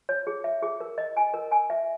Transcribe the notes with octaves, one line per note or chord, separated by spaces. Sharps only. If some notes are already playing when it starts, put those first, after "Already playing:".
C#5
G#4
E5
G#4
A#4
D#5
G#5
A#4
G#5
E5